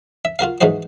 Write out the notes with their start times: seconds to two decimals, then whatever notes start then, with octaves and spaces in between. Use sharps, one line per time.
0.25 E5
0.39 F4 F#4 A#4 F5
0.61 G#2 E3 D#4 F#4 C5